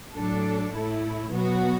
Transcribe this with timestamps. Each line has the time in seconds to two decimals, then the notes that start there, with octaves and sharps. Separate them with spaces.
0.14 A2 F#3 D4 A4
0.73 A2 A3 E4
1.31 B2 F#3 B3 F#4